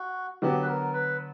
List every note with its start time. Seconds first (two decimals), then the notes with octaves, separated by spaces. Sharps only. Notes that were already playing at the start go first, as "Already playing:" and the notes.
Already playing: F#4
0.42 D3 F#3 B3 F#4 G4
0.62 B4
0.68 A#4
0.94 B4